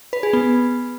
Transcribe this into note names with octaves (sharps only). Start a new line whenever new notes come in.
B4
G#4
B3